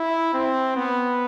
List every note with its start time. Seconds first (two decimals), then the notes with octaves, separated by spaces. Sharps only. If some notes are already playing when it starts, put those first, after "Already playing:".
Already playing: E4
0.33 C4
0.77 B3